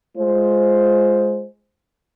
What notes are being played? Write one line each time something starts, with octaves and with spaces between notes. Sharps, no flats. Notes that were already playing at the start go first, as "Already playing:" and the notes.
G#3 F4 C5